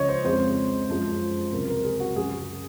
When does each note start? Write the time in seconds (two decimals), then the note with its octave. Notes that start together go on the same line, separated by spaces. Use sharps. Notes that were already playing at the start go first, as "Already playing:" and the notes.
Already playing: C#2 C#3 F3 C#5 D#5
0.09 C5
0.24 F2 C#3 G#3 C5
0.88 F#2 F3 G#3
1.52 C#2 C3 F#3 A#4
1.69 A#4
1.84 G#4
2.00 F#4
2.16 F#2 C#3 F#3 G#4